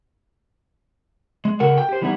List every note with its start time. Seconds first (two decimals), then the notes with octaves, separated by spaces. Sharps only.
1.45 G#3
1.60 C#3 F#4 A4 A#4 F#5
1.78 G5
1.89 G4 C5
2.02 E3 G3 B3 D#4 E4